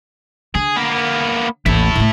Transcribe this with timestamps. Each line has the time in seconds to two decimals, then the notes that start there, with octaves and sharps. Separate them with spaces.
0.55 D3 G#4
0.76 A#3 B3
1.66 A1 D#2 E4 A4
1.95 A2 A3